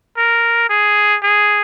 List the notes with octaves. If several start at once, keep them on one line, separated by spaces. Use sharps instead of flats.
A#4
G#4
G#4